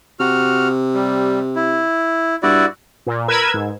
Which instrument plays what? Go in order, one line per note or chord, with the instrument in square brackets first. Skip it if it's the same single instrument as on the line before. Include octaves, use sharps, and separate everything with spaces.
[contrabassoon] C3 [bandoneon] F#4 F6
[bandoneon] G3
E4
[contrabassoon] G2 [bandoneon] E4 F#4 D5
[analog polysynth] A#2
A#4 B4 E6 G#6
G#2